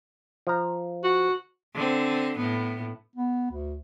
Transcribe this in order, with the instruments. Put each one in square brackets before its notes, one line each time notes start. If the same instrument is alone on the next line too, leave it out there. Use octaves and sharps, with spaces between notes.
[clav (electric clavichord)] F3 A#5
[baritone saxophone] F#4
[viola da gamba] D3 C4
A2 B3
[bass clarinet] B3
D2